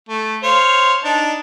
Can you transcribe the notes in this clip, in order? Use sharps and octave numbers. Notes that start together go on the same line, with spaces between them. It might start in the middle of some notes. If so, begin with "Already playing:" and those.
A3
C5 C#5 F5
D4 D#4 A5